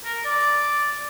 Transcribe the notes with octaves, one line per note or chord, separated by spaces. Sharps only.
A#4
D5